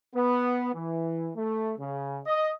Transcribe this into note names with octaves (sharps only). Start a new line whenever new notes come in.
B3
E3
A3
C#3
D#5